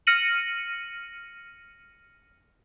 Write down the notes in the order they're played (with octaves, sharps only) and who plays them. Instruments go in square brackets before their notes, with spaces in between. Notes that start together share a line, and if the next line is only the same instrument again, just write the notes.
[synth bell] F6 A#6 C#7 D#7 F#7